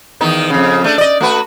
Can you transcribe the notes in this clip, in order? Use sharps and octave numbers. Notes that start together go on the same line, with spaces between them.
E2 D#3 D#4
F2 C#3
A3 D4
D5 D#5
A3 F#4 B4